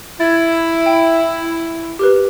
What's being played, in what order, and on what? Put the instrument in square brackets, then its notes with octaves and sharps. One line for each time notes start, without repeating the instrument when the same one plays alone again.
[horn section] E4 [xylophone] G#6 A6
[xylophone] G5
G4 A#4 B4